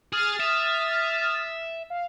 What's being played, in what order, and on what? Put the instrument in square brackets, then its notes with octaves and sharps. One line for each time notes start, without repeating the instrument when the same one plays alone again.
[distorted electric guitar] G#4 [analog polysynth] D#6 F6 A6
[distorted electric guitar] E5
[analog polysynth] F5